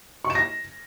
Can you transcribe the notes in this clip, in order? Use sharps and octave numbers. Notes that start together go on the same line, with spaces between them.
C#6
E7
A#6